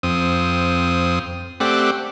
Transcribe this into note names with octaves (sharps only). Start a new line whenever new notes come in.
F2 C4 D#6
A3 C4 G4 D5 F#5